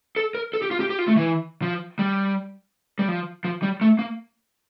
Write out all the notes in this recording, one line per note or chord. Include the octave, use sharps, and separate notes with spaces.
A4
A#4
A4
G4
F4
G4
G4
F4
A3
E3
F3
G3
G3
F3
F3
G3
A3
A#3